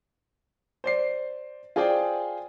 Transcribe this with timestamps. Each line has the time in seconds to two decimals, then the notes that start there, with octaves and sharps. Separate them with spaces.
0.84 C5 D5 C7
1.76 F4 G#4 C5 D5 G5 G#5